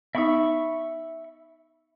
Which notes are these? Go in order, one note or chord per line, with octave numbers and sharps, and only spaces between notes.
B3 D#4 E5 B5 C#6